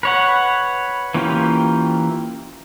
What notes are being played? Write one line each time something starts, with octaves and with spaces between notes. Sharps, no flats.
B4 C#5 F#5
E3 A#3 C#4 F4 G4